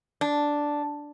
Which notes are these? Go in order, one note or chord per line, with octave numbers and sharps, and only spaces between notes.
D4